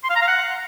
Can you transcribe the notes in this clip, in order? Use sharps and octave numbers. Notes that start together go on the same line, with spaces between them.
C6
F5
A#5
F5
F#5